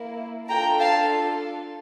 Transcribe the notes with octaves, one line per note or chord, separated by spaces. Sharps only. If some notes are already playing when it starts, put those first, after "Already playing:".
Already playing: A#3 E4
D4 F4 A4 G5 A#5
F5 A5